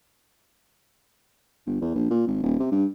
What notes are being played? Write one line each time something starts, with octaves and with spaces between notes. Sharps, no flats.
G1
E2
A#1
A#2
G#1
D#1
C3
G2